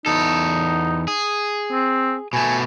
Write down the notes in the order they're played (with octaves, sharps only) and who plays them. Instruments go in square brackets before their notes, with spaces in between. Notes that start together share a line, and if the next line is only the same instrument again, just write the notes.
[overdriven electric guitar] E2 A4 [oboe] D#4
[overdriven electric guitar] G#4
[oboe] C4
[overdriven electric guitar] B2 A3 [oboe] G#5